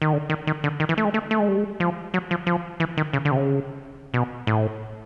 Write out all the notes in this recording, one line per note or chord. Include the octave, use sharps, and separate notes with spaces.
D#3
D3
D#3
D#3
D3
D#3
E3
A3
G#3
A3
A3
G#3
G3
G#3
F3
F#3
F3
F3
E3
D#3
C#3
D3
C3
C#3
B2
A2